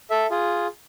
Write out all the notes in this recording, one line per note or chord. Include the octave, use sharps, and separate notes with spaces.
A4 E5
F4 G#4